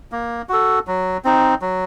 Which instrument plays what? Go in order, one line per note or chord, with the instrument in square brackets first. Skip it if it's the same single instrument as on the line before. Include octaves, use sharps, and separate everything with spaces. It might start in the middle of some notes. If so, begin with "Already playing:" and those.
[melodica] A#3
F#4 A4
F#3
C4 D#4
F#3